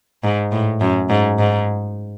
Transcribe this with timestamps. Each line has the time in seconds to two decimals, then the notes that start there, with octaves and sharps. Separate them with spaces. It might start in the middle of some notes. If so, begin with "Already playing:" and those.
0.23 G#2
0.52 A2
0.81 F#2
1.09 G#2
1.39 G#2